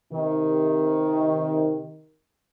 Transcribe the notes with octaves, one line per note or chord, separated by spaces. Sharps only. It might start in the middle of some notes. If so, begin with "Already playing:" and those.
C3 D#3